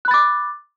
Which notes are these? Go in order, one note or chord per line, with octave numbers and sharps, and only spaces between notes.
B5 D6 F#6 A6